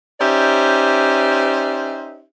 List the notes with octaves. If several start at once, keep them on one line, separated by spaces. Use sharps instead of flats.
C#4 D#4 G4 C5 D5 E5